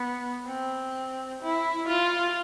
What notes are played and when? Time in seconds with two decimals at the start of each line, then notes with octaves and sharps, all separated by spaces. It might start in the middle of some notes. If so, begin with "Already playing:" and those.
Already playing: B3
0.46 C4
1.42 E4
1.88 F4